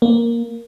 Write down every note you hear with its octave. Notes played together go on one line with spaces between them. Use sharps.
A#3